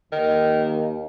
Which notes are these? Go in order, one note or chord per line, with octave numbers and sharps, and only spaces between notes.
D#2 D#3